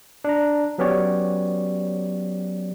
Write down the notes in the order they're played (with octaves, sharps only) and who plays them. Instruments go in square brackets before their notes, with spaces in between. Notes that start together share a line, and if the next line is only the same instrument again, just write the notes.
[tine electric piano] D4 A#5
F#3 B3 C#4 G4 C#5 D5